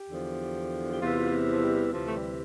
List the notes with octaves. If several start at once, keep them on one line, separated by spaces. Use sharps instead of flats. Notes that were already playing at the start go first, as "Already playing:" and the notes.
Already playing: G4
E2 D3 F3
G4
E2 C3 E3 F4
C4
F3
G3
D2 C3 E3 F3
A3
G3